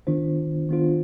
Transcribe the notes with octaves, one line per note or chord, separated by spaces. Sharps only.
D#3 B3 D4 F4 C5
D#3 B3 D4 F4 C5